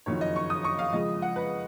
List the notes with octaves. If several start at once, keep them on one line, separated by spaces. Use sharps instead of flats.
F#1 F2 D#3 F#3 C#5
D#5
C#6
D#6
C#6
F5
F2 C#3 F3 G#3 D#5
F#5
B4